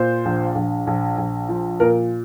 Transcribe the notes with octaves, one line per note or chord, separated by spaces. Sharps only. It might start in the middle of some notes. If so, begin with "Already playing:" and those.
Already playing: A#2 C5
A#1
A#1
A#1
A#1
F3
A#2 A#4